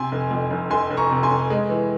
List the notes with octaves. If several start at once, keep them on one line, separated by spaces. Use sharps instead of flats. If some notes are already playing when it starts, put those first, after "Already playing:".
Already playing: C3 G#5 C6
F1
F2
F1
F1 G#5 C6
F1
A#5 C#6
C3
G#5 C6
F1
G#3
E3